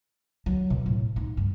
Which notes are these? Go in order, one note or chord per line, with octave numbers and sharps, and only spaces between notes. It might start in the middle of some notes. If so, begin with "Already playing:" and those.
F#3
B2
A2
D#4
G2